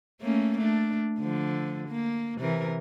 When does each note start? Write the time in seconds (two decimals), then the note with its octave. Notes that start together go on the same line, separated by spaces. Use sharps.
0.22 A3 A#3 C#4
0.58 A3 D4
1.20 D3 F3
1.88 A#3
2.39 C3 E3 A#4